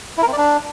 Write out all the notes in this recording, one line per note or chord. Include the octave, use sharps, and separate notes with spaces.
E4
A#4
C4
D5
D4